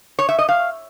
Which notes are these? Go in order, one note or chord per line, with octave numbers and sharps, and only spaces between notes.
C#5
E5
D#5
F5